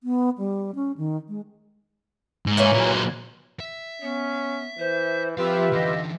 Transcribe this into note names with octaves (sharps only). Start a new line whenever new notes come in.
B3
G3
C#4
D#3
G#3
G#2
E3 A#3 C#4
A#2 F#3
E5
B3 C#4
E3 C5
F3 C4 F4 G4 B4 E5 F5
D3 E3 D#5